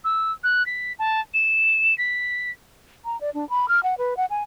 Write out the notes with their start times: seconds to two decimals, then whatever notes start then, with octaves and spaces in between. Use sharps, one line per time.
0.04 E6
0.44 F#6
0.66 B6
0.99 A5
1.34 E7
1.98 B6
3.05 A#5
3.21 D5
3.34 D4
3.50 B5
3.68 F6
3.83 F#5
3.98 B4
4.17 F#5
4.30 G#5